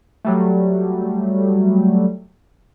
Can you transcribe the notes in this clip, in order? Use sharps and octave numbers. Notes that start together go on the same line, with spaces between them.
F#3 G3 A3